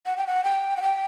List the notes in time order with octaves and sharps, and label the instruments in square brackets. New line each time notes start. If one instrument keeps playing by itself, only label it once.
[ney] F#5
G5
F#5
G5
F#5
G5